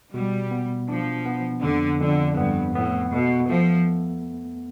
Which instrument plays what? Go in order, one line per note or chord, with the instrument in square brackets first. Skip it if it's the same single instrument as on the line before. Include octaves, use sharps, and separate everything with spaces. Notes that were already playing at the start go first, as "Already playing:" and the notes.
[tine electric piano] B2 [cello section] G3
[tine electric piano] B3
[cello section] F3 [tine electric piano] D4
[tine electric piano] B3
[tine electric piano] F2 [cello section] D3
[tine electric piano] F2 [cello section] D3
[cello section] G2 [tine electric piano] B3
[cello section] A2 [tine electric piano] B3
[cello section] B2 [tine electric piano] A3
[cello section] F3 [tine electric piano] A3